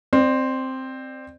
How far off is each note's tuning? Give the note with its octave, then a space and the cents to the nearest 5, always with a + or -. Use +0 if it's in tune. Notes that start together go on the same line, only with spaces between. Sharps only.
C4 +0 D5 +30